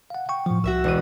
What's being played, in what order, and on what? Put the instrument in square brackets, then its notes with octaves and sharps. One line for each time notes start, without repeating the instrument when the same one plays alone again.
[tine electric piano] F5 F#5
G5 C#6
A2 F3
[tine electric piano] C2 [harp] F#4 E5 E6
[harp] E1 D4 D#7